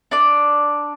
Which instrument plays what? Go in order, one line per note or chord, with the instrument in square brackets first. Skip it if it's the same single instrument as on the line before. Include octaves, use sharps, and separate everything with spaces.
[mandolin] D4 D5